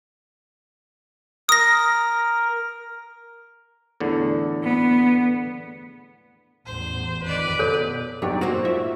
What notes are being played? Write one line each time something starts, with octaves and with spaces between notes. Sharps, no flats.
A#4 D#6 A#6
E2 A2 D3
B3
A1 E2 C5
F2 D#3 B4 D5
B2 A4 C#5
E2 G2 F#3 D#4 G4 C#5 D5
A#3 C4 F#4 C5
G#2 F4 F#4 E5